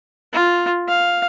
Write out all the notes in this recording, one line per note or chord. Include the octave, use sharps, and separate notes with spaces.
F4
F5